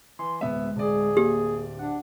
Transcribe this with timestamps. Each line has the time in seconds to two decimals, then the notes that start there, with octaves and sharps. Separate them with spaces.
0.19 E3 C6
0.41 D1 G#3 B3 E5
0.76 D1 G#4 D5
1.17 A#3 G4
1.79 D4 F#5